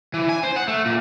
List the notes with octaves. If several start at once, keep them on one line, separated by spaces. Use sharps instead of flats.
E3
G#5
C5
F#5
A3
A#2